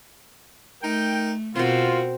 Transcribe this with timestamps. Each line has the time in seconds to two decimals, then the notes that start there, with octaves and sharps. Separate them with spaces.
0.83 A3 D#4 A#4 G5
1.55 B2 C4 F4 F#4 A4 A#4 C5